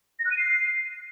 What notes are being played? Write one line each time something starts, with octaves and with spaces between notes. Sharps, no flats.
A#6
F#6
D#7
C7